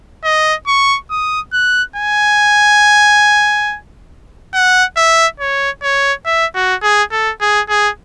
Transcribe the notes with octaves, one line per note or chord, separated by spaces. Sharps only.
D#5
C#6
D#6
F#6
G#5
F#5
E5
C#5
C#5
E5
F#4
G#4
A4
G#4
G#4